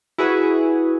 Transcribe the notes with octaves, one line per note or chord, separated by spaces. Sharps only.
E4 F#4 G#4 B4